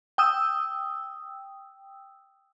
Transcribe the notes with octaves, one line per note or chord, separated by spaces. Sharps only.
G5 D#6 E6